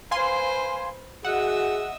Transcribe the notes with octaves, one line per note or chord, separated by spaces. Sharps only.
B4 C5 F5 G#5 C6
F#4 G#4 D#5 E5 F#5 E6